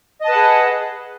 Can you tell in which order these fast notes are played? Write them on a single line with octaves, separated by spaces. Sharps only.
D#5 A5 B4 F#5 G#4